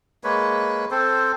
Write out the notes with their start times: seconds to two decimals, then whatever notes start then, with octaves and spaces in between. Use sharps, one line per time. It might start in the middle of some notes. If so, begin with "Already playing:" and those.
0.24 G#3 A#3 B4 C#5
0.91 C4 A4 C5